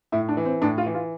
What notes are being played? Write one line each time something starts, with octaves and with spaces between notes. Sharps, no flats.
A2 E4
D4
E3
C4
A2 D4
F4
E3
F4